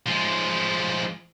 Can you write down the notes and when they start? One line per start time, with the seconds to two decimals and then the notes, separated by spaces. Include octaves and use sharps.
0.06 F3 G#3